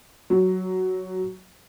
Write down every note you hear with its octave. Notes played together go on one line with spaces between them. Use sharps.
F#3